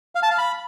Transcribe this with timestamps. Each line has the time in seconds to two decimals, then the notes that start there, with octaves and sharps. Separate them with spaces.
0.15 F5
0.23 A5
0.30 F5
0.38 B5